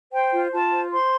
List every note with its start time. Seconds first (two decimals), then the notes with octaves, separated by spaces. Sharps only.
0.13 C5 G5
0.33 F4
0.53 F4 A5
0.73 C5
0.93 C5 C6